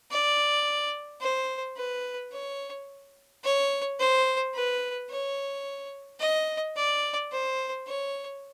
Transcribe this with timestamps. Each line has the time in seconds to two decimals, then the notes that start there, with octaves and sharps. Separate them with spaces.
0.11 D5
1.21 C5
1.77 B4
2.32 C#5
3.44 C#5
3.99 C5
4.54 B4
5.09 C#5
6.20 D#5
6.76 D5
7.32 C5
7.87 C#5